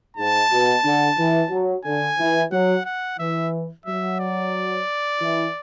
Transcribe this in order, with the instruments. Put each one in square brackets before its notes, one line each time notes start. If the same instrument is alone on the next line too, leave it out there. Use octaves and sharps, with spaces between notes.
[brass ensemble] G#2 [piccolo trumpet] A5
[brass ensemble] B2
D3
E3
F#3
[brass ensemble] D3 [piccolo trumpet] G#5
[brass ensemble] E3
[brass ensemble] F#3 [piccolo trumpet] F#5
[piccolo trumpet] F#5
[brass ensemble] E3 [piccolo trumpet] E5
[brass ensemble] F#3 [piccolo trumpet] E5
[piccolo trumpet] D5
[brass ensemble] E3